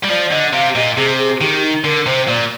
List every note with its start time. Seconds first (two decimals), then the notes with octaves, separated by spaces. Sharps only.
0.03 G3
0.09 F3 D5
0.31 D3 D#5
0.53 C3 F5
0.75 A#2 D#5
0.97 C3 G#4
1.19 G#4
1.40 D#3 G4
1.62 D#4
1.84 D3 A#4
2.06 C3 C5
2.28 A#2 D5